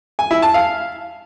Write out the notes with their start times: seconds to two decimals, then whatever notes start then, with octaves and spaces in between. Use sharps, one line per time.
0.19 G#5
0.31 E4
0.42 A5
0.54 F5